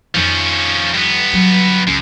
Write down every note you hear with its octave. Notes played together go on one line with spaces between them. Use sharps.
F2 D#3 F3 C#4
G2 B3
F#3
C#2 F#2